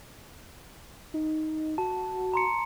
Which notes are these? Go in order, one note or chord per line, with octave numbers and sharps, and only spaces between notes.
D#4
F#4 A5
A#5 C6 C#7